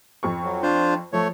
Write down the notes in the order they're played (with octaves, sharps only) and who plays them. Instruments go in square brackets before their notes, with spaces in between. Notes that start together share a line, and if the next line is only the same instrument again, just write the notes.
[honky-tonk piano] F2 C#6
[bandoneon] F#3
D4 F4 C5
[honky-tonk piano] F3 [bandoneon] A3 C#5